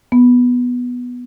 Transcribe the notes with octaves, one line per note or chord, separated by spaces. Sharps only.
B3